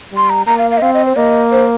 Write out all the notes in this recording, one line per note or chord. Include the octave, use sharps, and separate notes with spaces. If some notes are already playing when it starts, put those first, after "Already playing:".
G3 C6
A#5
A#3 A#5
F5
F5
D#5
C4 F5
D#5
C5
A#3 D#5
C5